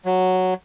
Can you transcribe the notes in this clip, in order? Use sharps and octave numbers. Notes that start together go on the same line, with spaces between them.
F#3